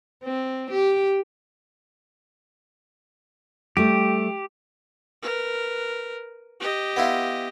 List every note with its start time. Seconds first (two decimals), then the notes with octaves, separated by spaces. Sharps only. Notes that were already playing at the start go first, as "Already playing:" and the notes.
0.24 C4
0.71 G4
3.77 G3 A3 G4
5.22 A#4 B4
6.60 G4 D#5
6.96 B3 E4 F4